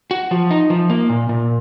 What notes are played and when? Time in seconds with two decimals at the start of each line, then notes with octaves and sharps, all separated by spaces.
0.11 F#4
0.31 F3
0.51 D#4
0.70 F3
0.90 A#3
1.09 A#2
1.29 A#2